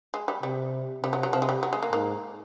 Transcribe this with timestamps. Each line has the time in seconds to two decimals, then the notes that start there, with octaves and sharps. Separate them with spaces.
0.14 G#3
0.28 G3
0.43 C3 G3
1.03 C3 G3
1.13 F#3
1.23 F#3
1.33 C3 F3
1.42 G#3
1.49 G3
1.63 F#3
1.73 G#3
1.83 A#3
1.93 G#2 A#3